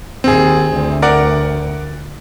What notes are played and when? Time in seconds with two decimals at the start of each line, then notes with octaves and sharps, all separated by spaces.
0.24 D#2 C4 G#4
0.72 D2
1.02 A#4 D5 F#5